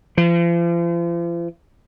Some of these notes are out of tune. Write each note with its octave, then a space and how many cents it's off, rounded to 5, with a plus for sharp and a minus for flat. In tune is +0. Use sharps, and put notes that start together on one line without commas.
F3 -40